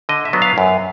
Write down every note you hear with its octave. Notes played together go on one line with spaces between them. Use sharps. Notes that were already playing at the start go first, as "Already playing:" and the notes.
D3 D#5
E5
F#3 B3 D4
F5
F#2